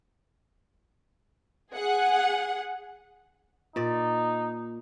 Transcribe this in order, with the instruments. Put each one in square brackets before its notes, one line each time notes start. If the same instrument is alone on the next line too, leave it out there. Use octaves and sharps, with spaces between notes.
[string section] G#4 F#5
[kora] A#2 D5 [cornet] D#4